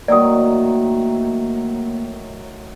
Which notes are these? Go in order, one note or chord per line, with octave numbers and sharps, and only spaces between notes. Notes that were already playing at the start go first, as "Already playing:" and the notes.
A2 D#3 F#3 A#3 D5 D#6